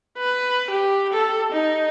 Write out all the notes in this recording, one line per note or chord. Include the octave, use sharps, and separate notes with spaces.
B4
G4
A4
D#4